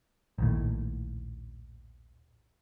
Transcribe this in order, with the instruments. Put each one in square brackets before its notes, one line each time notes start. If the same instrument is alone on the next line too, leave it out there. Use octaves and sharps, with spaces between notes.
[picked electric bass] A#1 D#2 A2